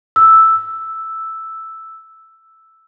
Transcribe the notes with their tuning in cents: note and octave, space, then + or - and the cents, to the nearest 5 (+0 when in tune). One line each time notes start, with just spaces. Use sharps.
E6 +0